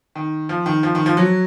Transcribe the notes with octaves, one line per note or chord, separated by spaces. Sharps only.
D#3
F3
D#3
F3
D#3
F3
F#3